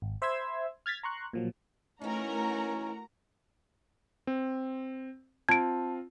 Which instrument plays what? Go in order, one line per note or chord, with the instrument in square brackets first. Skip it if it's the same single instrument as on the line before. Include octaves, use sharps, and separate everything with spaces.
[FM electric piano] G#1
C5 E5 B5 C6 E6 G#6
F6 G#6 A6 B6
A#5 C6 C#6 F#6
A#2 F3 F#3
[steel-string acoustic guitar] E3 D#4 [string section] A3 F#4 A#4 [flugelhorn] C#4 [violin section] A#5
[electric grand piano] C4
[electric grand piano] C4 F4 [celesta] A5 [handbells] G#6 D7